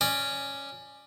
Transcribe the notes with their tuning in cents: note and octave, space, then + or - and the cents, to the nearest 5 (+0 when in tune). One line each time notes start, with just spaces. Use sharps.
C#4 +0 D5 +20